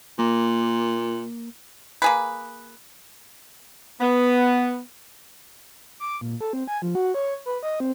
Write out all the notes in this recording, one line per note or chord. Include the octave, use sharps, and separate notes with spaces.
A#2 A#3
A#3 G#4 B4
B3
D6
A#2
A4
C4
G#5
F3
F#4
C#5
B4
D#5
C4